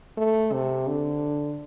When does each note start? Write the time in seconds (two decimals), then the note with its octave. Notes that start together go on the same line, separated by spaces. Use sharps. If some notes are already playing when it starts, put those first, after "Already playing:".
0.17 A3
0.53 C3
0.87 D3